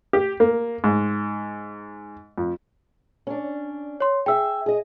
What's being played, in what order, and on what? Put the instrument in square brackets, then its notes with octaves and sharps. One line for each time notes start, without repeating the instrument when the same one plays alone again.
[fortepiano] G4
A#3
G#2
F2
[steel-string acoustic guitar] C#4 D4
[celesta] C#5 C6
[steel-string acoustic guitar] G#4 E5 [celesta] G5 E6
[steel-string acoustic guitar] G#4 D#5